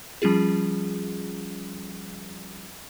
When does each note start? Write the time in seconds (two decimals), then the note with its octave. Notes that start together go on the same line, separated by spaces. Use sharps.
0.22 F3 G3 C#4 F4 G#4